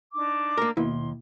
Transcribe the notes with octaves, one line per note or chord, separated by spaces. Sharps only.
D4 D#4 D6
A#3 A#4
D#2 B2 A#3 E4 C6